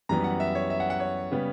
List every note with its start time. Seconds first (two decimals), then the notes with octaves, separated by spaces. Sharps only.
0.09 F#2 E3 G3 B3 A#5
0.24 F#5
0.40 E5
0.55 C#5
0.70 E5
0.80 F#5
0.90 F#5
1.00 C#5
1.31 C#3 G3 B3